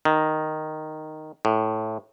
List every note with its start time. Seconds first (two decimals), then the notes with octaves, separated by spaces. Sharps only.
0.05 D#3
1.45 A2